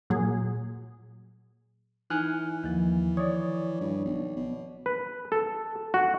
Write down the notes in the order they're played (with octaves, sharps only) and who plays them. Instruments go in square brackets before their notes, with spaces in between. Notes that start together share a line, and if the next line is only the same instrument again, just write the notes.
[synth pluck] A#2 F#3 G#4
[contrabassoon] E3 [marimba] D#4 [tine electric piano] G#5 F6 F#6
[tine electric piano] D#2 [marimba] D#3 F3
[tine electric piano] C#5 D5 [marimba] D#6
[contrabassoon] G2
B1
B2
[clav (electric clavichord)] B4
A4
F#4